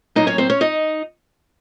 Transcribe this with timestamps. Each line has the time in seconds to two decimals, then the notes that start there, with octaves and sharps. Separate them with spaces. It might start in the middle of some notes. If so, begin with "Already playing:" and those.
0.15 A2 F#3 A#3 D#4 D#5
0.27 C#4 C#5
0.38 C4 C5
0.50 C#4 C#5
0.61 D#4 D#5